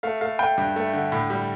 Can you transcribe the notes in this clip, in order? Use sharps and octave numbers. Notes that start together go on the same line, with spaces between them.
A3 F5
A3 F5
A3 G5
G2
A3
D3
A2
G3